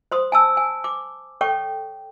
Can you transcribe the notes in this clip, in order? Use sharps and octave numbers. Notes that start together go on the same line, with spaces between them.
C5 C6 D#6
G#5 A5 E6
G#5
D6
A4 C#5 G5 C#6